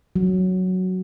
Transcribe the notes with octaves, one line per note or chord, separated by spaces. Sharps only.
F#3